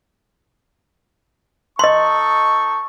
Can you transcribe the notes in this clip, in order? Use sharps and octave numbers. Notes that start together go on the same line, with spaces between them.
D#4 A4 D#5 C6 C#6